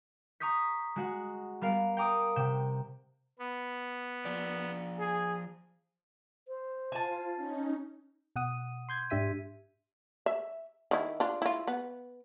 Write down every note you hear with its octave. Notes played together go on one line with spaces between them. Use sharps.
A#5 C#6 D#6 G6 B6
G#3 F#4 F#5
G3 B3 A#4 F5
G5 A#5 D6 D#6
C3 G5 E7
B3
F3 D5
G#4
C5
F4 G#5 A5
C#4 D#4
B2 F#5 D#6 D#7
C6 G6 G#6
G#2 D4 G4 E5 B6 D#7
E5
D#3 E4
D4 F4
E4 F4
B3